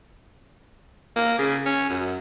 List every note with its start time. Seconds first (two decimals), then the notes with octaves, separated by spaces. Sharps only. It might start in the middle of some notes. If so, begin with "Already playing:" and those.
1.16 A#3
1.39 C#3
1.66 C#4
1.90 F#2